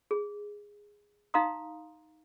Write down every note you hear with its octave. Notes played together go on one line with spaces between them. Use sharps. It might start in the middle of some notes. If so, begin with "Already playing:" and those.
G#4
D#4 F5 A#5 C6 D#6